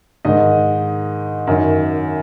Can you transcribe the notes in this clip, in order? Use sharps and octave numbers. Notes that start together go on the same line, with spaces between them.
G#2 D#3 D#4 D#5
F#2 D#3